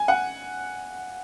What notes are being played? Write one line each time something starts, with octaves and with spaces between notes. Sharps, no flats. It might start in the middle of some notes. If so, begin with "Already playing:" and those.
Already playing: G#5
F#5